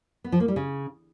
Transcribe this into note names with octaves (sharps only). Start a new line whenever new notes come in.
B3
F3
A#3
G3
C#3